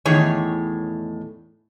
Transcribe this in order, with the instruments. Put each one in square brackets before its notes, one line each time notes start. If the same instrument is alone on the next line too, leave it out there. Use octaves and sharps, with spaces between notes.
[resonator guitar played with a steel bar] E2 A2 D#3 G#4 C#5